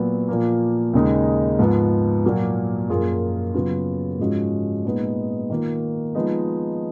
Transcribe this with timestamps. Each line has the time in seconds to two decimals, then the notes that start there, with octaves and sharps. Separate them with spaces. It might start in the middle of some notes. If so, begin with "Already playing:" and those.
Already playing: A#2 F#3 B3
0.28 A#2 F3 A#3
0.93 D#2 C#3 G#3 D#4
1.59 G#2 F3 B3
2.24 A#2 F#3 A#3
2.89 F#2 F3 A#3 F4 G#4
3.54 C#3 F#3 B3 F4
4.19 G#2 F3 G#3 C#4 F#4
4.84 A#2 G#3 B3 D#4
5.50 D#3 A#3 F4
6.15 F3 G#3 B3 D#4